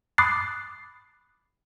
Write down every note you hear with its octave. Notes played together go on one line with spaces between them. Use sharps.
B5 D6 D#6 F#6 A6 C7